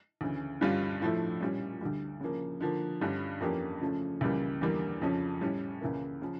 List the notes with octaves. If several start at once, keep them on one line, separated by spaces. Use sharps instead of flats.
D2 C#3 E3
G2 D3 G3 C#4 F4
A2 F3 A3 E4
A#2 G3 C#4
D2 D3 G3
C#3 F3 A#3
D3 F3 A#3
G2 D3 G3 C#4
F2 E3 A#3 C#4 G4
C#3 F3 A3 C#4
C#2 C#3 E3 G3 A#3
E2 D3 G3 A#3
F2 C#3 F3 C#4
A2 G3 C#4
C#2 C#3 E3 A#3
C#3 F3